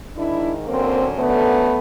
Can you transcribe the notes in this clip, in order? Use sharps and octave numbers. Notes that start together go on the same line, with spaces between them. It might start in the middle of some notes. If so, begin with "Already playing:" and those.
G#2 D#3 D4 E4
F#2 D3 A#3 C4
F#2 D3 A3 B3